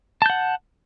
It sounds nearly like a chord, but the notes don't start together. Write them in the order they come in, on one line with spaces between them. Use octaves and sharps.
A5 G6 F#5